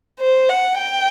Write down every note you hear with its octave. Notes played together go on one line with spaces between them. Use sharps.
C5
F#5
G5